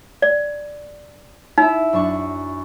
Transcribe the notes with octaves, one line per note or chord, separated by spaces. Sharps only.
D5
D#4 E4 E5
F#2 D4 C#6